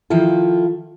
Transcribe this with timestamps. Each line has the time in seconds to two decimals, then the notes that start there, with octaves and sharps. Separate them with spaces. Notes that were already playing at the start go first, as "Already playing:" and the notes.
0.10 D#3 F3 E4 F4 A4